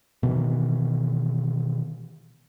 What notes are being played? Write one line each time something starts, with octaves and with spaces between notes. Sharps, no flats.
B2 D#3 E3